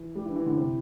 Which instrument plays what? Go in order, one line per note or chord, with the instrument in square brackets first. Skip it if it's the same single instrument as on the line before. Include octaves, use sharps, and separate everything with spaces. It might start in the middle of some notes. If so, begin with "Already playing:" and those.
Already playing: [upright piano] E3
[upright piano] G3 [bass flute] G4
[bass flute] E4
[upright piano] E3
[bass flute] D4
[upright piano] E3 [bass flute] E4
[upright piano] D3
C3